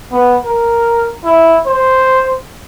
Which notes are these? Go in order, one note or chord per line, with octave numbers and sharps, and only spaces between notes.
B3
A#4
E4
C5